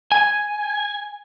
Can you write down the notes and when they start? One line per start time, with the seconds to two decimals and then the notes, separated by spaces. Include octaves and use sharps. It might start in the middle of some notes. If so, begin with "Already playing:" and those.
0.12 G#5